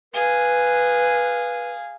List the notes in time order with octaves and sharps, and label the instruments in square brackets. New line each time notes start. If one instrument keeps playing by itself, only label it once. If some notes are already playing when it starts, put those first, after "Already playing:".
[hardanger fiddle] G#4 F5 [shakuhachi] B4